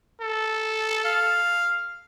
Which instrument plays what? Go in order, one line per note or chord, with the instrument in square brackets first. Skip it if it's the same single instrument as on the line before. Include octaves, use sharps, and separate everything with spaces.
[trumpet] A4
[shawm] F5